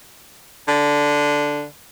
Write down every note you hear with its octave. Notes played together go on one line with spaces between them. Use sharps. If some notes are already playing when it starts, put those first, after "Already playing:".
D3